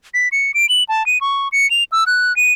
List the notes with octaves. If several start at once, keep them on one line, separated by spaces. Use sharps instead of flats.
B6
C#7
D7
F#7
A5
D#7
C#6
C#7
F7
E6
F#6
D#7